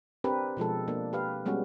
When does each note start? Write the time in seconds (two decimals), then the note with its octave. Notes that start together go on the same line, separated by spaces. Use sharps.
0.24 C4 D4 G4 A#4 B4
0.57 B2 F3 G#3 A4
0.88 A#3 D4
1.13 G4 B4 F5
1.46 G3 G#3 B3 C#4 F#4